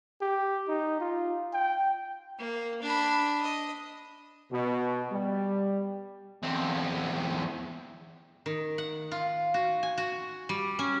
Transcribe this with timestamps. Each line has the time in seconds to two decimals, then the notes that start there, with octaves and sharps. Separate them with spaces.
0.21 G4
0.68 D#4
1.01 F4
1.53 G5
2.39 A#3
2.82 D4 B5
3.42 D#5
4.52 B2
5.12 G3
6.43 E2 C4
8.46 D#3
8.78 F#5
9.11 F4
9.54 F#4
9.83 G#5
9.98 F#4
10.49 G3
10.79 C#4